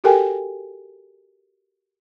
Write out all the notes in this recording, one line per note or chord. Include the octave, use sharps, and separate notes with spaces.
F#4 G4 A4 A#4 G5 G#5